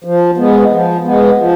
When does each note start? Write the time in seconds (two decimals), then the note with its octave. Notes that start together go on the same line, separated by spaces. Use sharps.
0.04 F3
0.37 G#3 B3
0.71 F3
1.04 G#3 B3
1.38 F3